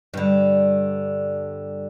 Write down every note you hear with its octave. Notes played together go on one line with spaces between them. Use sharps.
G2 D3